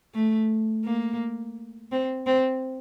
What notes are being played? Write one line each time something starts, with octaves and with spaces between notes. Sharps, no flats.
A3
A#3
C4
C4